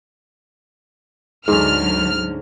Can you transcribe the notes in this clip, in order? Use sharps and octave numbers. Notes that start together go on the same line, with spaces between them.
D2 G#2 D3 F#3 C#4 F6